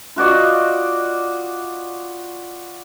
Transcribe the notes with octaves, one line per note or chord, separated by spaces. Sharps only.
F4 F#4 D5 D#5